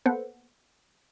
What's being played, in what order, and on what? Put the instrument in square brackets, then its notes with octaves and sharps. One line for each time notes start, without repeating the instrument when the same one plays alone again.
[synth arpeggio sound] A#3 B3 A4 B4 C5 F#5